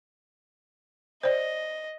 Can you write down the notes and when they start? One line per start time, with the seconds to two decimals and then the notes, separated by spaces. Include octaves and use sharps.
1.23 C5 D5 D#5